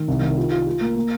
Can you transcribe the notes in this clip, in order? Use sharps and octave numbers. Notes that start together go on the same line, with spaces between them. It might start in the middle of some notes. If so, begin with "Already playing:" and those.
Already playing: D#3
C2
D#3
F4
F4
F4
A#3
A#3